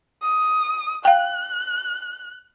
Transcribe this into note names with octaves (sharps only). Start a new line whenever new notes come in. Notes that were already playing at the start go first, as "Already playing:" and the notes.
D#6
F5 G5 F#6